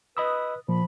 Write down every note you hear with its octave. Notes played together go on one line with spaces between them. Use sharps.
B4 D#5 B5 D#6 E6
A#2 F3 B5